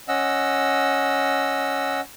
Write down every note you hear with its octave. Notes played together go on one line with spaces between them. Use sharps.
C#4 D#5 F#5 E6